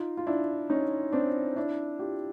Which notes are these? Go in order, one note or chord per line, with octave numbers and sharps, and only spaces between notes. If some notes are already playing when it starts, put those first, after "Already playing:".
Already playing: D#4 F4
F4
D4 E4
C#4 D#4
C4 D4
D4 E4
F4 G4